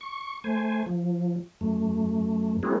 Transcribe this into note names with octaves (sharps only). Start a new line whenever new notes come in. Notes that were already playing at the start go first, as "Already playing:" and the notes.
C#6
A3 C5 G#5
F3
F#2 A3
G3 A#3 C4 E4 F#4 G#4